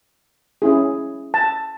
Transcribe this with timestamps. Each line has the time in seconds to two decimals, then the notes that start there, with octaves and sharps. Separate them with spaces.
0.62 C#4 E4 G#4
1.34 A5